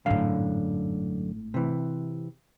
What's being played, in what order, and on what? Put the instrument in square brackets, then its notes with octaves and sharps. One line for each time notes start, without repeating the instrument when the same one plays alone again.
[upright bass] G#1 A2 [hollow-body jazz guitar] F#2 D3 F5
[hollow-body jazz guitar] C3 E3